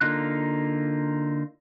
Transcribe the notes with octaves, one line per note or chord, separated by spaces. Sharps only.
D3 A#3 D#4 F4 F#6